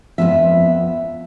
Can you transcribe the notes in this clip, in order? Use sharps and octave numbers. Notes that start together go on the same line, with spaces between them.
F2 C3 F3 B3 E5